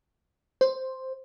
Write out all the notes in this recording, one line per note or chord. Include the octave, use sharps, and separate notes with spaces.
C5